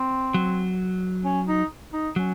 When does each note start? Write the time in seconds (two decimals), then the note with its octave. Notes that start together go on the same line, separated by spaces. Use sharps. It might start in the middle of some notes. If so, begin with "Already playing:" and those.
Already playing: C4
0.34 F#3
1.25 C#4
1.48 D#4
1.93 D#4
2.16 F#3 C#4